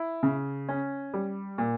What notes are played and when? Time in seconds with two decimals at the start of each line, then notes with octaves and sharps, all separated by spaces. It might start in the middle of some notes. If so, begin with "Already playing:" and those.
Already playing: E4
0.23 C#3
0.69 C#4
1.14 G3
1.58 A#2